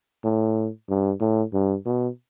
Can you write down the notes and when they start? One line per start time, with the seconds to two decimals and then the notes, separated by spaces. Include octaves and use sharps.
0.25 A2
0.90 G2
1.21 A2
1.53 G2
1.86 B2